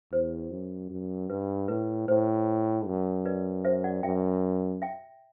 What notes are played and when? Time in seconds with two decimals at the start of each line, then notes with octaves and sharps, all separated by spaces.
0.12 E2 C5
0.51 F#2
0.90 F#2
1.30 G2 B4
1.68 A2 B4
2.08 A2 C5
2.86 F#2
3.25 B4 D5
3.65 C5 E5
3.84 D5 F#5
4.03 F#2 E5 G5
4.82 E5 G5